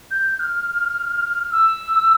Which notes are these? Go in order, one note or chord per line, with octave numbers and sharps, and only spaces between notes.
G6
F6
E6